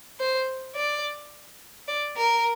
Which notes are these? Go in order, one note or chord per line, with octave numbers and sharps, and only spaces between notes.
C5
D5
D5
A#4